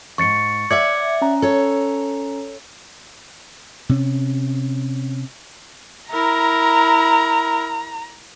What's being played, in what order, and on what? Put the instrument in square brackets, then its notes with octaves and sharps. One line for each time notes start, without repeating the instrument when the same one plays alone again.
[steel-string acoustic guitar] F2 G#2 [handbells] C#6 A6 C#7
[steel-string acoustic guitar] D5 E5 F#5 [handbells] D6 G#6 C#7
[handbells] C#4 A#5
[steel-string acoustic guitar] A4 C#5
[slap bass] C3 C#4
[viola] E4 A#4 [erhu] A#5